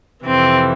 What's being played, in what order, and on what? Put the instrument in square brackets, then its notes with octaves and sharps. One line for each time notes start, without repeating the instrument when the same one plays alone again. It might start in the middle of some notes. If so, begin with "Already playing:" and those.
[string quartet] F2 C3 E3 C4